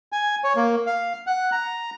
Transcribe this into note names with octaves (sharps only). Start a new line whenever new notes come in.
G#5
C#5
A#3
F5
F#5
A#5